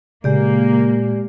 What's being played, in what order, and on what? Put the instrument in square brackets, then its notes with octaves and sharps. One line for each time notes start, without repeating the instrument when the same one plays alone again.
[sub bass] A#2 [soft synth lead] C#3 [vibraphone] G#3 G4 D5 [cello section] A#3